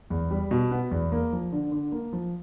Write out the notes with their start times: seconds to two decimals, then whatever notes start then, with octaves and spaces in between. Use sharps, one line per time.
0.10 E2
0.31 G3
0.51 B2
0.71 B3
0.91 E2
1.12 A#3
1.33 F3
1.52 D3
1.72 D3
1.92 A#3
2.13 F3